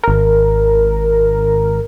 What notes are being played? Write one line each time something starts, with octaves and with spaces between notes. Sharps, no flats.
G#1 A#4